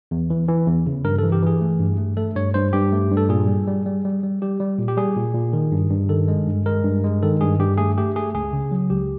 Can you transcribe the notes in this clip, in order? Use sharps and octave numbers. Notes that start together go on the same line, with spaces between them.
E2
E3
E3
E2
C#3
G2 A#4
A4
E3
G4
E3 G#4
A3
G2
A3
A3 A4
G2 C#5
G2 C5
G2 G4
A3
G2
A4
A#2 G#4
G3
G3
G3
G3
G3
G3 G4
G3
A#2
G4
G3 G#4
A#2
A#2
D#3
G2
G2
D#3 A4
G#3
G2
G#3 A#4
G2
G#3
D#3 A4
G2 G#4
G2 G4
A3 G#4
A3 G4
A3 G#4
C#2 G#4
C#3
F#3
C#2 G4